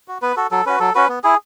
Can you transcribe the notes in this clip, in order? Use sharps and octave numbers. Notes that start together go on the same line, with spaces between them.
F#4
B3 B4
F#4 A4
F#3 A4
C#4 F#4 B4
F#3 A4
C#4 F#4 B4
B3
E4 G#4